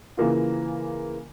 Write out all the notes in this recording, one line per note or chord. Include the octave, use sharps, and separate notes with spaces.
C#3 E3 A#3 F4